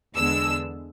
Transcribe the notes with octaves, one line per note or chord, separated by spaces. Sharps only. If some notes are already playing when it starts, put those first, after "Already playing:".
E2 D3 G#3 B3 D4 E6